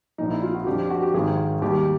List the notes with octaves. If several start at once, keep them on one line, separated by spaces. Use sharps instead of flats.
A#1 A#2 F3 D#4
E4
F4
F#4
F2 D3 F3 G4
G4
F#4
G4
G#1 G#2 D#3 G#4
D#2 D#3 G3 G4